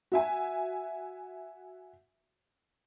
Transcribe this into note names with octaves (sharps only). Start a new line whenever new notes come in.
F#4 E5 G#5